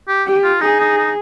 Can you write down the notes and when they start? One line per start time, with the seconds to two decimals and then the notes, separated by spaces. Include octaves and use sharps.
0.08 G4
0.27 G4
0.44 F4
0.61 D#4 G#4
0.80 D#4
0.97 D#4